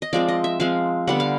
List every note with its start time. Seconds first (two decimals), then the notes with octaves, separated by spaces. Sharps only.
0.02 D#5
0.13 F3 G#3 C4 D5
0.28 D#5
0.44 E5
0.60 F3 G#3 C4 F5
1.08 D3 G3 B3 F#5
1.20 F5